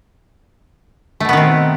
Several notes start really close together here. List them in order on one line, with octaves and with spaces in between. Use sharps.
A3 B2 B3 D#3 C4